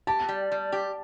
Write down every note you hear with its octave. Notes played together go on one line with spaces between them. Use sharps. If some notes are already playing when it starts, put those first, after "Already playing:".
G4 A5
G3
G3
G4